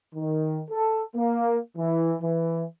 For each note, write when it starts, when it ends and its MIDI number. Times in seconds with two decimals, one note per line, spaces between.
0.14 0.62 51
0.71 1.01 69
1.15 1.57 58
1.77 2.14 52
2.21 2.64 52